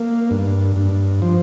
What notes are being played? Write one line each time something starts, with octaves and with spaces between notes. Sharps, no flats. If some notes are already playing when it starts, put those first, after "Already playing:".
Already playing: A#3
G2
G2
F3